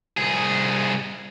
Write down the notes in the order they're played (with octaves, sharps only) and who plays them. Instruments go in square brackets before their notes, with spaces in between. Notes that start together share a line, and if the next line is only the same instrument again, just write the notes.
[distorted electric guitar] C2 G#4